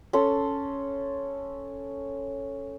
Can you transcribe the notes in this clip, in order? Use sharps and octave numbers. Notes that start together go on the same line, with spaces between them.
C#4 A4 C6